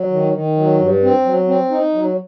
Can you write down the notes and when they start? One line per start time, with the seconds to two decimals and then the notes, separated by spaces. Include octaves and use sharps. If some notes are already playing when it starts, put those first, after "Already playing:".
Already playing: F#3
0.10 D#3
0.33 D#3
0.56 F#3
0.78 G2
1.03 C4
1.25 F#3
1.48 C4
1.70 D#4
1.94 F#3